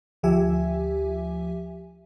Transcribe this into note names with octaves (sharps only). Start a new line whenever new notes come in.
D2 F3 G4 E5 G#5